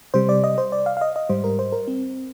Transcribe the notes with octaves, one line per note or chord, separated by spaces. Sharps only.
C3 G3 C5
D5
D#5
C5
D5
F5
F5
D#5
D#5
G#2 G3 C5
A#4
C5
A#4
C4